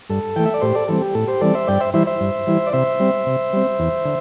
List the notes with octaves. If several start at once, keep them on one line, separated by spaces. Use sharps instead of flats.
G2 A4
E3 A3 G5
E5
D5
A2 G4 C5
A4 D5
E3 G3 C4 A4
G4
A2 A4
G4 C5
E3 G3 C4 A4 D5
C5 E5
G2 D5 G5
C5 E5
E3 G3 E4 C5 E5
C5 E5
G2
E3 G3 E4
D5
C3 C5 E5
G3 C4
C3
G3 C4
E2
D3